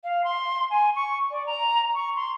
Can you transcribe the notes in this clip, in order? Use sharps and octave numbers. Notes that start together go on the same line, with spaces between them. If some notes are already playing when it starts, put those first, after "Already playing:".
F5
C6
G#5
C#6
D5
A#5
C#6
C6